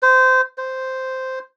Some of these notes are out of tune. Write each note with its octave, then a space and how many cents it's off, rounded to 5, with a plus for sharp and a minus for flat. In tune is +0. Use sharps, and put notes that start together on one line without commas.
C5 -20
C5 -5